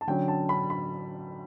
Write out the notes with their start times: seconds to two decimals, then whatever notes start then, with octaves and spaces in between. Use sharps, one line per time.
0.01 A5
0.07 D3 F#3 C#4 G5
0.28 A5
0.49 B5
0.70 B5